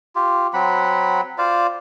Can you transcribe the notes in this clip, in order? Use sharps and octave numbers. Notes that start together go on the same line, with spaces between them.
F4 G4
F#3 C4 F#5 B5
F4 C5 D5 F5